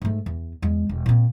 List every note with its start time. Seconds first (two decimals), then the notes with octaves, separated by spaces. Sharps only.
0.02 G#2 A3
0.26 E2
0.62 E2 G#3
0.89 E1
1.06 A#2 C4